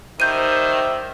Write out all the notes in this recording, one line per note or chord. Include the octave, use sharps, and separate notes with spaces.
D#3 G3 A#4 C5 E5 G6 D#7